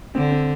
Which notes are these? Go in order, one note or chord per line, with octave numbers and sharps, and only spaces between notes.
D3 C4
C4